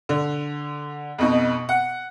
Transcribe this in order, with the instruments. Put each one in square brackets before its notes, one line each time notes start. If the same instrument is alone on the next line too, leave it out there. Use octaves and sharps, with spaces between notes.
[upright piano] D3
F2 B2 D#4
F#5